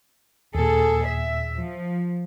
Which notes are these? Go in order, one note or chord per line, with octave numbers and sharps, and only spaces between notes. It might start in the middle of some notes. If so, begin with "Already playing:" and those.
D#2 A#2 G#4 A4
E5
F3